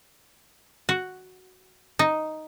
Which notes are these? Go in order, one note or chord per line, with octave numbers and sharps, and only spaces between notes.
F#4
D#4